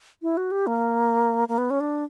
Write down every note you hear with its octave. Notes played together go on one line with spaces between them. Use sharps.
E4
F#4
G4
A#3
A#3
B3
C#4
D4